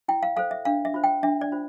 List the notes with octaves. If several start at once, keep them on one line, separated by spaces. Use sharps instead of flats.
E4 G5
F5
A4 C5 F5
E5
D4 F5
E5
F4 C5
G5
D4 E5
D5
F4 C5